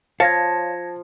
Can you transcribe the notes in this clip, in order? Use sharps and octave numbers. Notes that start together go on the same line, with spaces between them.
F3 C#5 F5 A5 G#6 A#6 C#7